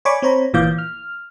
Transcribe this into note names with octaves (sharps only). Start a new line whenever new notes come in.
C#5 D5 G#5 B5 C#6 D6
C4 C5 C#5 A#5 B5
G1 A#2 E3 F5 D6 G6
F6